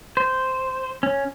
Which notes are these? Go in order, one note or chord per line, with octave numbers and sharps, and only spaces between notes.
C5
C#4